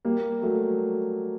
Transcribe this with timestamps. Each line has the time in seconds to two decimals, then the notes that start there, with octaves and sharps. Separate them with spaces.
0.05 G3 A#3
0.42 F#3 A3